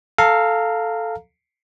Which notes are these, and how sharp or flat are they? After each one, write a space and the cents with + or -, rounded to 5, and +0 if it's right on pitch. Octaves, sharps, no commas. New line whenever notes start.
A4 +0 F5 +0 A#5 -20